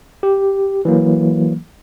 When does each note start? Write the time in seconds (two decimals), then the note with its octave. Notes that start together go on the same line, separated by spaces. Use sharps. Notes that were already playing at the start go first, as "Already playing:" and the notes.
0.23 G4
0.85 E3 F#3 A#3